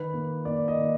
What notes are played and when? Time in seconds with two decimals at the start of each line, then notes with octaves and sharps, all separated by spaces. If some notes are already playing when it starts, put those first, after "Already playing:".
Already playing: D#3 B4
0.14 A#3
0.45 A#3 D5
0.68 D#5
0.78 D#3